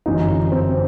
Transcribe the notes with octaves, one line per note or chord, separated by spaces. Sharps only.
G1 F#2 E3 D#4
C4